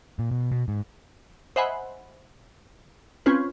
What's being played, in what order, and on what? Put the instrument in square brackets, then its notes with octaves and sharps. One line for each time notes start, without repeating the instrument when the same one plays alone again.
[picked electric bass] A#2
B2
B2
G#2
[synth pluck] C5 D#5 E5 F#5 G#5 B5
C4 C#4 F4 B4